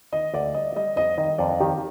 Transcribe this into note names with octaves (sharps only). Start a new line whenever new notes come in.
D#3 D#5
D2 D5
G3 D#5
G3 D#5
F2 D#5
D#3 D#5
F2 D5
D#3 G4